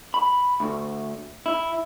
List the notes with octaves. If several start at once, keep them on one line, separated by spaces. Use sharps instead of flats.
B5
D2
E4